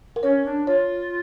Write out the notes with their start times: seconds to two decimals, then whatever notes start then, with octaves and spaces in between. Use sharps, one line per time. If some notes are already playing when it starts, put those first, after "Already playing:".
0.16 A#4
0.23 C#4 C#5
0.45 D4
0.67 F4 C#5